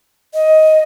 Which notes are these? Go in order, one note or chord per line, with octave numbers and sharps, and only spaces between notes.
D#5